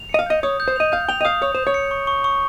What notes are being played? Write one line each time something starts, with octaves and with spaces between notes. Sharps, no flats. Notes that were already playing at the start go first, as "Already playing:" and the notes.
Already playing: F7
D#5 C#7
F5
D#5 G6
C#5 D#6
G6
C5
D#5 F7
F5 G6
G5 F7
D#5
F5 D#6
C#5 D#6
C5 G6
C#5
C#7
C#6
C#6
C#6